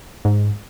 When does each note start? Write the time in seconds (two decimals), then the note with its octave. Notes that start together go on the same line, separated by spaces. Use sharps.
0.25 G#2